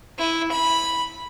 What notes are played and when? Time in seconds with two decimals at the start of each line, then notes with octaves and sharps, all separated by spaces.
0.18 E4
0.52 B5